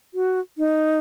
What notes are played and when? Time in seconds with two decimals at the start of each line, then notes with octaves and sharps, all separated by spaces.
0.14 F#4
0.58 D#4